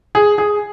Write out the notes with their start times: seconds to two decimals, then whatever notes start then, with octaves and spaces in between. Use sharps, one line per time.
0.15 G#4
0.38 G#4